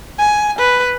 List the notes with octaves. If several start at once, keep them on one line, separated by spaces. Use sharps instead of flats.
G#5
B4